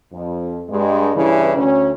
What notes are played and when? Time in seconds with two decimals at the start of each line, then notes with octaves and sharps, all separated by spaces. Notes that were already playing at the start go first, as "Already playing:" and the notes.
0.12 F2
0.69 G2 G#3
1.15 G2 C#3 E3
1.56 D2 C#4